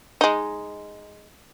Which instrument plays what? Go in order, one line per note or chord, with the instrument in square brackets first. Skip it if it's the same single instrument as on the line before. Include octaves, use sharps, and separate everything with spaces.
[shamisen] G#3 D#4